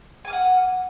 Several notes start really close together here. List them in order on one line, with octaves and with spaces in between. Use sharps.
G#5 D6 F6 F#5